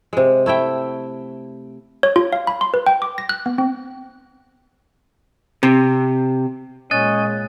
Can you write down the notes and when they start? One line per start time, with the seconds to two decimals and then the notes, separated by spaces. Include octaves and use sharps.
0.13 C3 G#3
0.46 A3 E4 E5 G5
2.03 C#5
2.16 F4
2.33 F5
2.47 B5
2.61 C6
2.74 B4
2.86 G5
3.02 D6
3.18 A#6
3.29 F#6
3.46 B3
3.58 C4
5.63 C3
6.91 A#2 G#3 C#4 D#5 F#6 A6